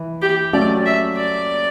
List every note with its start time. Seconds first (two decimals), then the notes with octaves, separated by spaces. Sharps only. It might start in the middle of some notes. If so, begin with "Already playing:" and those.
Already playing: E3
0.22 G4
0.53 F#3 A3 C#4 G4 D5
0.86 E5
1.17 D5